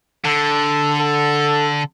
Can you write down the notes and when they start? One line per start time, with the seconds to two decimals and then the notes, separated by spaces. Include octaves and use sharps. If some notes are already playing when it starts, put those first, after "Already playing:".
0.25 D3 A4
1.00 A4